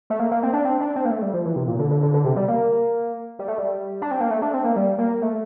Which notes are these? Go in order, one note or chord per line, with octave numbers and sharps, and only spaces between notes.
A3
A#3
A#3
C4
D4
C4
D4
C4
A#3
A3
G3
F3
E3
C3
A#2
D3
D3
D3
D3
C3
G3
A#3
G3
A3
G3
D4
C4
A#3
A3
D4
C4
A#3
G3
A#3
A3